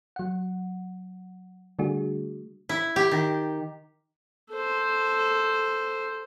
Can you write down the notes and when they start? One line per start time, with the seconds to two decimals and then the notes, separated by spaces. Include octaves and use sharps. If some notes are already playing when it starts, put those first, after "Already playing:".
0.16 F#3 F#5
1.79 D3 G3 A3 D4 F#4 G#4
2.69 E4
2.96 G4
3.11 D#3
4.53 A4 C5